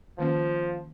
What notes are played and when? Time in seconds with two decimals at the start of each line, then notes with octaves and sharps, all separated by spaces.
0.19 D#3 F3 A#3 C#4